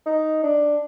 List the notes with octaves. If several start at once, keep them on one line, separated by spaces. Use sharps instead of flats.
D#4
D4